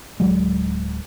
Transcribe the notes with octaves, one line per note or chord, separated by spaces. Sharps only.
D1 F#3 G#3